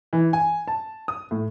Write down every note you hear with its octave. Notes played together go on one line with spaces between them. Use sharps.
E3
G#5
A5
D#6
A2